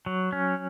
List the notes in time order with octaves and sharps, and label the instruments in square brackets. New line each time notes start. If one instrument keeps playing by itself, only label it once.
[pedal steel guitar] F#3
C#4